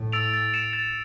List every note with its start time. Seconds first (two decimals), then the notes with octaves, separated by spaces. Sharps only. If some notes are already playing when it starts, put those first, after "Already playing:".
Already playing: A2
0.12 E6 A6 D7 F7
0.33 A6
0.54 C#7 E7
0.73 A6